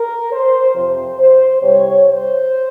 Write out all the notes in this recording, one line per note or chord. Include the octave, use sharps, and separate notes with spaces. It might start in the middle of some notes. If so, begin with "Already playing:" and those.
Already playing: A#4
C5
F2 C3 F3 C5
C5
C2 C3 G3 C#5
C5